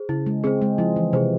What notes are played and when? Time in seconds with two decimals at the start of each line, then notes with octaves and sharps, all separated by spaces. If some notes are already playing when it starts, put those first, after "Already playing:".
Already playing: G#4 C5
0.09 C#3 E4
0.26 G#3
0.44 C4 G#4 C5
0.62 G#3
0.78 F3 E4
0.96 E3
1.13 C3 G#4 C5